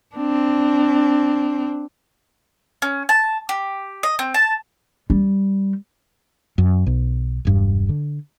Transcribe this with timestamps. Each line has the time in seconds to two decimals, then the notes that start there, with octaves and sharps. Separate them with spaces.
0.15 C4 D4
2.82 C#4
3.09 A5
3.49 G4
4.03 D#5
4.19 C4
4.34 A5
5.10 G3
6.58 F#2
6.87 B1
7.45 E1 G2
7.89 D3